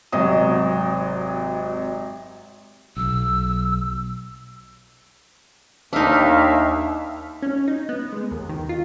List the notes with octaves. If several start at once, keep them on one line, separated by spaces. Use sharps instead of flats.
G#1 C3 F#3 D#5 D#6
B1 E6
D#2 D4 D#4 E5 F5
C#4
D#4
B3
G#3
D#2
D#3
F4